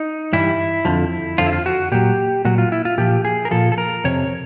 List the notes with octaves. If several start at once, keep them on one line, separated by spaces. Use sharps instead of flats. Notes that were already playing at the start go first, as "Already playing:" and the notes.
Already playing: D#4
G2 E3 G3 E4
F2 D3 F3
F2 D3 F3 F4
E4
F4
F#4
A#2 F#3 G4
A#2 F#3 F#4
F4
E4
F4
A#2 F3 G4
G#4
A#4
A#2 F3 A4
A4
A#4
F2 C3 C#5